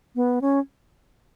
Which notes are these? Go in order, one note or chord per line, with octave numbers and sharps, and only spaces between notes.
B3
C#4